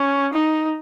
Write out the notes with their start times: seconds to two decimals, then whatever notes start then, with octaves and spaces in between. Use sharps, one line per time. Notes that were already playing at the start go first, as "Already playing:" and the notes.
Already playing: C#4
0.33 D#4